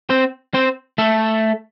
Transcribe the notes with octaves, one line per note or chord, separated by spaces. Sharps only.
C4 C5
C4 C5
A3 A4